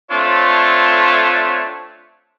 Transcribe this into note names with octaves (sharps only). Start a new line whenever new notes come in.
A3 C4 D4 F4 C#5